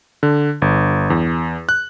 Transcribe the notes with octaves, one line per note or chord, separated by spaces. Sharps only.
D3
G1
E2
F#6